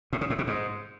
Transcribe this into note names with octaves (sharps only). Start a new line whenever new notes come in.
A2
C#3
A2
B2
G#2